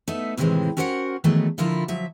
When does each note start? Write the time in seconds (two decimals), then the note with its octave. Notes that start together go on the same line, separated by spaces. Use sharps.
0.08 A3 B3 D#4 E5
0.37 A2 C3 D#3 E3 G#3 C4
0.77 C#4 F#4 A#4 C5 F5 F#5
1.24 D#3 E3 F#3 G#3 A3 B3
1.58 D3 F3 E4 F4 A#4
1.88 F3 F#3 E5